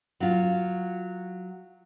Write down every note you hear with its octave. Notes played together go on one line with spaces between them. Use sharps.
F#3 F4